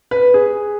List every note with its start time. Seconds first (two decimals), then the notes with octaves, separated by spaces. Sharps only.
0.11 B4
0.34 G#4